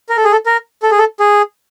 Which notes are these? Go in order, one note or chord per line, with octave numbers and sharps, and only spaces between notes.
A#4
A4
G#4
A4
A#4
A4
G#4
A4
G#4